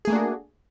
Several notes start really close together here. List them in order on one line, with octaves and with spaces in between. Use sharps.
G#4 A3 A#3 D4 F#4